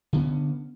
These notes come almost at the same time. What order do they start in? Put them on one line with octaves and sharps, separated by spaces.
D3 B3 C#4